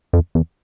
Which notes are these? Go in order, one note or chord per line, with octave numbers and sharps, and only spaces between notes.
F2
E2